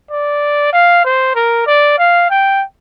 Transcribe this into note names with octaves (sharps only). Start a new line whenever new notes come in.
D5
F5
C5
A#4
D5
F5
G5